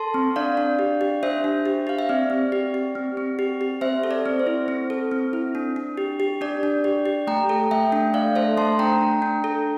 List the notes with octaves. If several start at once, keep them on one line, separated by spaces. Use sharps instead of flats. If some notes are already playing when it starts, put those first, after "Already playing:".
Already playing: A4 A5 C6
C4
D4 D5 F5
D4
G4
G4
D4 C5 E5
D4
G4
G4 F5
E5
C4 D5
C4
G4
G4
C4
C4
G4
G4
C4 C5 E5
A4
D5
C4
C5
E4
C4
A4
C4
E4
D4
D4
G4
G4
D4 D5
D4
G4
G4
A3 G5 A#5
A4
A3 E5 G5
D4
A3 D5 F5
A4 C5 E5
A3 A5 C6
D4 G5 A#5
D4
D4
A4